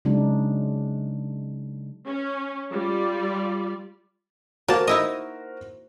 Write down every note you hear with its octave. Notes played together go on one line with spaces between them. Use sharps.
C#3 F#3 G#3 D4 D#4
C#4
G3 F4 D5
A#3 F#4 A#4 C5 A5
D#4 E4 D#5